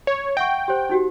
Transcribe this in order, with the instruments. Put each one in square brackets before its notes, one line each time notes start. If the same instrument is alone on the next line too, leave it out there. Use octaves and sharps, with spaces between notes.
[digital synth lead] C#5
[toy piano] E5 F#5 C#6 [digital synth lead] G5
[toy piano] G4 C5
D#4 F#4 G4